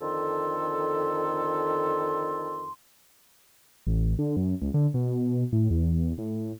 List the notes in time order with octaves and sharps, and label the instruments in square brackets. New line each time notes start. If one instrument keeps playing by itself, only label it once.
[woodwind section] F2 D3 D#3 A4 C6
[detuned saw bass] A1
D3
F#2
C#2
D3
B2
A2
E2
A2